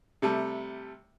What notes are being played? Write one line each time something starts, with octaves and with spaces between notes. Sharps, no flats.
C3 G3 A3